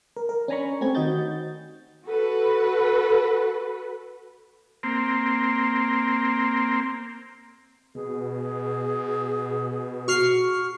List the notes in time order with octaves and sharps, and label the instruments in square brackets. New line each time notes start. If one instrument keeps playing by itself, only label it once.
[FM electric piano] A#4
A#4
C#4 D4 G#5 A#5 B5 C#6
A3 C4 G4 G#6
D#3 F#4 D#5 G6 A6
[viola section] F#4 A4 B4
[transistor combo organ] A#3 C4
[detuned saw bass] B2 [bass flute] G#4
[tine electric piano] F#4 [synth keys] C#6 F6 C7